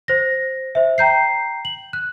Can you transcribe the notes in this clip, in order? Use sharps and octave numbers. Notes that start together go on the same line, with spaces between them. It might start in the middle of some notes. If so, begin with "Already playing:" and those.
C5 A#6
C5 E5
G5 A#5 G6 C7
F#7
F#6